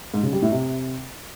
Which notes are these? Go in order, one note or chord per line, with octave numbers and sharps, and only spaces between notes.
G#2
C#3
G3
A2
C3